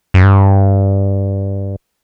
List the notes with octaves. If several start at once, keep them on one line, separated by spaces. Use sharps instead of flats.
F#2
G2